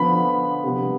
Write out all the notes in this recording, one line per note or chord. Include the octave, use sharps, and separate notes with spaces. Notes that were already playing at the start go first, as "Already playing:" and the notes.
Already playing: D3 F3 B3 B5
C3 G3 B3